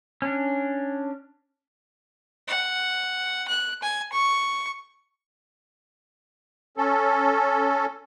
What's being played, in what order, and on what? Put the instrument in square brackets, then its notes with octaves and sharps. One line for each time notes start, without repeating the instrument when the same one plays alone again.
[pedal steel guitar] C#4 D4
[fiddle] F#5
F#6
G#5
C#6
[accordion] C#4 A4